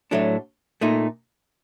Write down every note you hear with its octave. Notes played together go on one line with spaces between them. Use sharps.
A2 F#3 A3 D4
A#2 A3 D#4